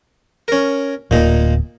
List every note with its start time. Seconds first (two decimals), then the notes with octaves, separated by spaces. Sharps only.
0.48 C#4 A#4
1.11 D1 A#2 D#4